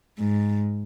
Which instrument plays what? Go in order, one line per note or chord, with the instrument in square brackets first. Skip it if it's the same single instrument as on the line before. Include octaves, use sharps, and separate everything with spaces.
[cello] G#2